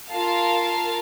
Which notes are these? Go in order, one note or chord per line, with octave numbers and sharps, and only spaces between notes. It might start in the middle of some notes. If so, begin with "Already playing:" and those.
F4 A#4 F5 A5